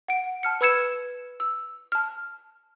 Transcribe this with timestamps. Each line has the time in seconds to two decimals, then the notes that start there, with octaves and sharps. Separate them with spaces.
0.08 F#5 D7
0.43 A5 F6 C#7
0.61 B4 B5 E6 G#6 C#7 E7
1.40 E6
1.92 A5 F6